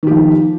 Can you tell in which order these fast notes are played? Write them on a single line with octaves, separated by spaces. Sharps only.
D#3 G4 F3